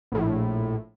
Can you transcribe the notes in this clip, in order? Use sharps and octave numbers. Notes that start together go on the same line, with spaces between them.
A#1 A2